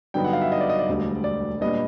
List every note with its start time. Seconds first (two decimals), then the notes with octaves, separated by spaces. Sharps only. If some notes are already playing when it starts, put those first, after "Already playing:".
0.14 G2 D3 F#3 B3 D#4 G5
0.24 F#5
0.33 F5
0.42 E5
0.52 D#5
0.61 D5
0.69 D#5
0.79 D5
0.88 E1 D2 D3 G3
1.24 D5
1.61 A#2 G3 B3 D4 D#5